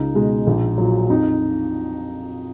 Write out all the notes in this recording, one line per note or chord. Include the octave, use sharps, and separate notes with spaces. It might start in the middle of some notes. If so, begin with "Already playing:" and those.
Already playing: C#2 D#4
B2 G#3
A#1
A#2 F#3
F2 D#4